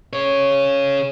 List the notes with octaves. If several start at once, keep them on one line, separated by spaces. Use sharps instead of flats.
G#4 C#5